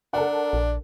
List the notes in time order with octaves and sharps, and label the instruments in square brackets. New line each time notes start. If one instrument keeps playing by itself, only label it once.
[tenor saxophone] D4 [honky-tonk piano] A4 A#4 F#5
[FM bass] A#1